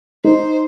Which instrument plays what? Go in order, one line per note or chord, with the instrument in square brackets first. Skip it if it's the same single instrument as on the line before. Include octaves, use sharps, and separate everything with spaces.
[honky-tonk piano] D#4 [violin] C5